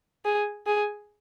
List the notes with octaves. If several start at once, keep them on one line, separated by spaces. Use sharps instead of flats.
G#4
G#4